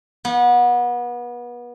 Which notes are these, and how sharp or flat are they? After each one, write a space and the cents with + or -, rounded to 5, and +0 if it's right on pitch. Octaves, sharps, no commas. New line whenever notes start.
B3 -30